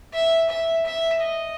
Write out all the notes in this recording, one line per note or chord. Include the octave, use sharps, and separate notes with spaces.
E5
E5
E5
D#5